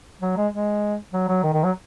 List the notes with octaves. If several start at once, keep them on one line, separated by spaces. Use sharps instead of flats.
F#3
G#3
G#3
F#3
F#3
D#3
D#3
F#3